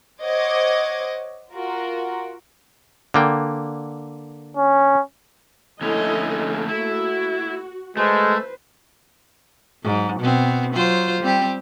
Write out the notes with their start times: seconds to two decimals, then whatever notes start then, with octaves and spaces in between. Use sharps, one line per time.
0.22 C5 C#5 D#5 F#5 D6 G#6
1.53 F4 F#4 A#4
3.14 D3 A#3 G5
4.57 C#4
5.81 F2 D3 A3 A#3 C#4 E4 A4 D#5
6.68 E4 F#4
7.97 G#3 A3 B4 C5
9.83 G#2 F#3
10.20 B2 B3 C4
10.73 F#3 F4 C5
11.21 G3 C4 G4